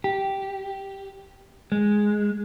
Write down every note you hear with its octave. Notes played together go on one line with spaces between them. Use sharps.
G4
G#3